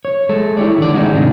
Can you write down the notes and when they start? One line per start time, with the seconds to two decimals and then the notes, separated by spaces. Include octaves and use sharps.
0.05 C#5
0.29 G#3 A4
0.57 E4 G4 C#5 D5
0.78 D3 D#3 D5
0.94 G#3 C#4 D#4 E4 F#4
1.14 G#2 C3 D#3 D4